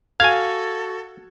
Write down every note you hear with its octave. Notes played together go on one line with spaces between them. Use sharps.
F#4 A4 F5 G#5 G#6